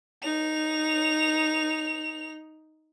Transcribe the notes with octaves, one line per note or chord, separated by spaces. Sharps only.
D#4 F7